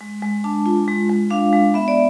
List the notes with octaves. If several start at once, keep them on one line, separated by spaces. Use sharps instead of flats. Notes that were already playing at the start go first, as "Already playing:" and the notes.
G#3
G#3
D4 A5
F4
G#3
G#3
D4 F5
G#3
B3 E5
D5